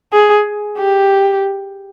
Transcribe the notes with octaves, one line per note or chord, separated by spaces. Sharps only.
G#4
G4